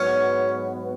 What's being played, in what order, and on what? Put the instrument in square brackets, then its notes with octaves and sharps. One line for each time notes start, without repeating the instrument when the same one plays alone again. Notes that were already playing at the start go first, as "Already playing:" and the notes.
Already playing: [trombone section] G#2 F#3 B3 F#4 B4 [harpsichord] C#4